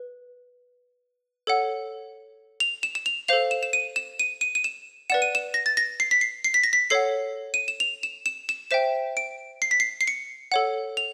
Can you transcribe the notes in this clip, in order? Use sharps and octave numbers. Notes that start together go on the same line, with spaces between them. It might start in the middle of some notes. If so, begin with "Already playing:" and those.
Already playing: B4
A4 C#5 F#5
F7
E7
E7
F7
A4 C5 F5 F7
E7
E7
D#7
E7
D#7
D#7
D#7
E7
B4 D5 F#5 E7
D#7
E7
A#6
A6
A#6
C7
B6
C7
C7
B6
A#6
B6
A4 C#5 F#5 C7
D#7
E7
F7
E7
E7
E7
C5 E5 G5 E7
D7
C7
B6
C7
C7
C#7
A4 C#5 F#5
F7